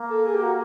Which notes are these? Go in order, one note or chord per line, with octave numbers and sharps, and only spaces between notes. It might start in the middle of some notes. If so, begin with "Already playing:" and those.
Already playing: A#3
A4
G#4
G4
F#4